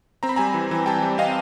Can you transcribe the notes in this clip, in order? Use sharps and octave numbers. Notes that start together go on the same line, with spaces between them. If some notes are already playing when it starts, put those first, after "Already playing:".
C4 A#5
B5
G3 G#5 A#5
E3
E3
G3 G5 A5
G3
C4 D#5 F5